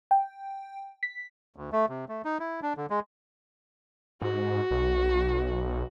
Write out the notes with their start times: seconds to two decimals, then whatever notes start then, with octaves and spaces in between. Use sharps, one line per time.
0.11 G5
1.03 B6
1.56 D2
1.72 A3
1.89 C3
2.09 A3
2.25 D#4
2.40 E4
2.62 D4
2.77 D3
2.90 G#3
4.22 G#2 F#4
4.71 B1